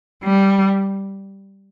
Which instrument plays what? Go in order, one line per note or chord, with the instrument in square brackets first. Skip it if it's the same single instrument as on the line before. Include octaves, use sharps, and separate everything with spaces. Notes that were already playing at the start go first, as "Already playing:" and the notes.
[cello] G3